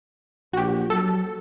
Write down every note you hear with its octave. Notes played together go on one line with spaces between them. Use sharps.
A#1 F#4 G4
F#3 A4